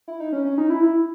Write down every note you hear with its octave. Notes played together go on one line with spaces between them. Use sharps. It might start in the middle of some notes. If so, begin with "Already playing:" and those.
E4
D#4
C#4
C#4
D#4
E4
E4